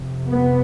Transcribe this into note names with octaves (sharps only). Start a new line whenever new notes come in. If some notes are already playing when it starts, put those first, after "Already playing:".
Already playing: F2 C3
B3